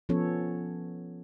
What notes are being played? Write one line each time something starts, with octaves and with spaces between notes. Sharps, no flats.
F3 B3 C#4 A4 C#5